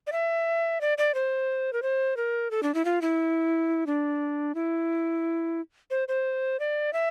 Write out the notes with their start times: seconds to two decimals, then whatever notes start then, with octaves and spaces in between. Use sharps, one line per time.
0.07 D5
0.12 E5
0.81 D5
0.98 D5
1.14 C5
1.73 A#4
1.82 C5
2.17 A#4
2.51 A4
2.63 D4
2.74 E4
2.85 F4
3.02 E4
3.87 D4
4.55 E4
5.91 C5
6.08 C5
6.60 D5
6.93 E5